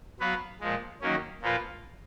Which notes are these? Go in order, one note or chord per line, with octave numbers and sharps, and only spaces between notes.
F#3 B3 F#4 B4 F5
A#2 F3 G#3
D#3 F#3 A#3 C#4
A#2 F3 A#3 F4 B4